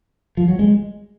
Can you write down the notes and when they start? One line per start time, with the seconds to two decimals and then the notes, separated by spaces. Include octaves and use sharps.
0.37 F3
0.48 F#3
0.59 G#3